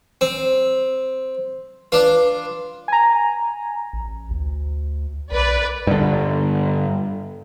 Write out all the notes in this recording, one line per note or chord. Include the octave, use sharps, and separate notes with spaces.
C4
D4 F4 B4
G#5 A#5
A1
D2
B1 B4 D5
G2 D3